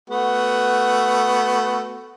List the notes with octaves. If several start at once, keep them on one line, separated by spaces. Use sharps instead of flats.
A3 B3 F#4